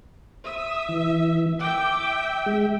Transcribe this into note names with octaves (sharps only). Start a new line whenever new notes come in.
E5 D#6
E3
E5 G5 D6
G#3